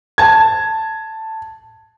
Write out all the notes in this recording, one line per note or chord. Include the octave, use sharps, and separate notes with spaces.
A5 G#6